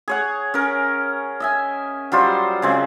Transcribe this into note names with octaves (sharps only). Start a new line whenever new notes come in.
G#4 C#5 F#5
C#4 A#4
D#5 E5 G#5
F#3 G3 F4 C5
C#3 G#3 C4